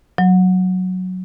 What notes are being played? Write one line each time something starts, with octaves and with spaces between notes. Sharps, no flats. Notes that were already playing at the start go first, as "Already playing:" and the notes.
F#3